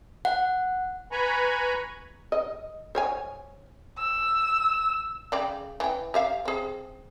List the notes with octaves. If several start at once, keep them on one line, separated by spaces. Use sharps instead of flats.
F#5
B4 G#5 A#5 B5 C#6
D#5
C5 C#5 G#5
E6
C#3 D5 G5
E3 G5
G4 E5 F5
C4 G#4